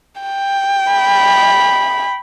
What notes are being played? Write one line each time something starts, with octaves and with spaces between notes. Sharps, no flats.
G5
B5